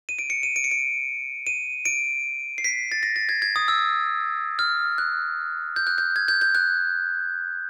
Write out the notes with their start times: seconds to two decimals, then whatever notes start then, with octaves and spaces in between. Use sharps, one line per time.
0.09 D#7
0.19 D7
0.30 C#7
0.43 D#7
0.56 D7
0.64 C#7
0.71 D7
1.47 D#7
1.85 D7
2.58 C7
2.64 B6
2.92 A6
3.03 A#6
3.16 A6
3.29 G#6
3.42 G#6
3.56 D#6
3.68 E6
4.59 F6
4.98 F#6
5.76 G6
5.87 F#6
5.98 G6
6.16 G#6
6.28 G6
6.41 G6
6.55 F#6